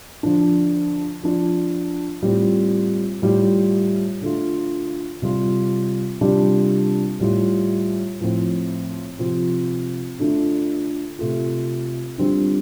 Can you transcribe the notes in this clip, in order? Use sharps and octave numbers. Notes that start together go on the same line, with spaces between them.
D3 F3 D4
F3 D4 F4
A2 G3 C4 F4
A2 G3 F4
D3 A3 F4
C3 G3 F4
C3 G3 D4 F4
A2 G3 F4
A2 F3 C4
C3 F3 C4 F4
D3 A3 D4 F4
C3 A3 F4
D3 G3 C4 F4